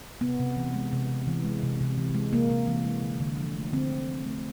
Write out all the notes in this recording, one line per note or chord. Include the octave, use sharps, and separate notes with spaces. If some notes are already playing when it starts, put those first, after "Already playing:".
C3 B3
C3
E3
G#3
C3
C3
E3
G#3
C3
C3
E3
G#3
C3 A#3
C3
E3
G#3
D3
D3
F3
A3
D3 C4
D3
F3
A3